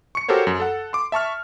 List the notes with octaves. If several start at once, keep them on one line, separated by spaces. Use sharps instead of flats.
C#6 C#7
F#4 G4 A4 A#4 C5 C#5
F#2
A4 F#5
C6 D6
E5 A5 C#6 F6